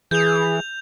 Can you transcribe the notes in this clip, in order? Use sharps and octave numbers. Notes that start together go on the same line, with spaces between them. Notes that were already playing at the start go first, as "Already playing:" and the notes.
E3 G#4 G6 F7